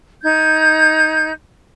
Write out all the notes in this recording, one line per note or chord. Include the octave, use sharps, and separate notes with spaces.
D#4 G6 G#6